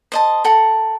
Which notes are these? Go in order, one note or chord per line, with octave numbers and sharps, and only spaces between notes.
C5 D#5 A5
A4 A#4 F#5